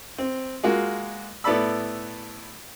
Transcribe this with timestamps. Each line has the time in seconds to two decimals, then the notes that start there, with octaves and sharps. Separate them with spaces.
0.18 C4
0.63 G#3 A#3 F4 F#4
1.44 A2 B3 A4 D5 B5 E6